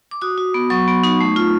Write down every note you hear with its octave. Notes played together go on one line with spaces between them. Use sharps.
D6
F#4 D#6
F#4
B3
F#3 C#6
B3
D#4
A3
F4